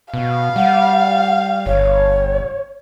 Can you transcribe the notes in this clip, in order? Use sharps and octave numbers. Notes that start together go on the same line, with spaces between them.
B2 F5
G3 F#5
G1 C#5